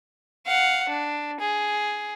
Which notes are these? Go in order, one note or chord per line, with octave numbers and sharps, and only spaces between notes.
F5 F#5
D4
G#4